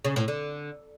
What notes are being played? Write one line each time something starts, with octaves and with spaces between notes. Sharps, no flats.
C#3
A2
D3